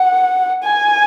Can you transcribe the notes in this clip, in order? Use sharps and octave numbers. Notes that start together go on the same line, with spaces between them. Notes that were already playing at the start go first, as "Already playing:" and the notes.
Already playing: F#5
G#5